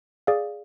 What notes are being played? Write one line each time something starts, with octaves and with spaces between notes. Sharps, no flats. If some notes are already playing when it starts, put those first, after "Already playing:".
G#4 D5 F5